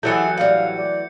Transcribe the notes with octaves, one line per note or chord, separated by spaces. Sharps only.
E3 F#3 A3 E4 G4 G#4 G6 C#7
A2 G3 F5
D5